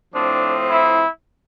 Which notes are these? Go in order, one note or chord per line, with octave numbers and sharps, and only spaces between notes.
A2 F3 C4 D4
E4